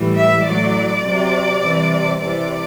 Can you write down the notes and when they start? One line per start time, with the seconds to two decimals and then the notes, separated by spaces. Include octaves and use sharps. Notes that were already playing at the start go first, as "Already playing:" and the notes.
Already playing: A2 E3 G3
0.16 E5
0.45 A2 F#3 D5
1.04 C3 F#3
1.61 C3 E3 G3
2.20 C3 E3 G3 D5